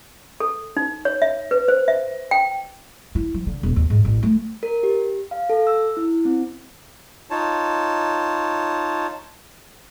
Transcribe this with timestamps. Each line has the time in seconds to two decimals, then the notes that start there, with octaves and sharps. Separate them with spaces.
0.40 A4
0.77 D#4
1.05 C#5
1.22 E5
1.51 B4
1.68 C5
1.88 E5
2.31 G5
3.15 E4
3.34 F3
3.47 D3
3.63 E1
3.76 D#2
3.90 G#2
4.05 A1
4.23 A3
4.63 A#4
4.83 G4
5.31 F5
5.50 A4
5.67 E6
5.97 E4
6.25 C4
7.31 D#4 F4 C#5 A5